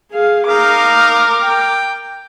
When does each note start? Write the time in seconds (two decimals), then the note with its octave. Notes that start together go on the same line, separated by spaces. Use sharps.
0.12 G#4 F5
0.48 D#4 A#4 F5 D6
1.42 G5